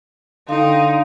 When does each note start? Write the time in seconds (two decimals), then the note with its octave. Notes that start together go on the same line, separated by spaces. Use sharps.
0.49 D3 D#4 F5 G5 C6